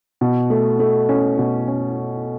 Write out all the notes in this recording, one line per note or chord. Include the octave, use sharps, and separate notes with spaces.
B2
A3
A3
C#4
B2
C#4